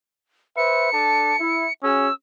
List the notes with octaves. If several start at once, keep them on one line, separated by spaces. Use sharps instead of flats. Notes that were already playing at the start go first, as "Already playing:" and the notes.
B4 C5 E5 C#7
D4 A4 A5
E4
C#4 F#4 G#4 E6